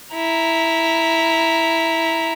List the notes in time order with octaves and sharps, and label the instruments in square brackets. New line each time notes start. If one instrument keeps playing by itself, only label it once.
[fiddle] E4 A#5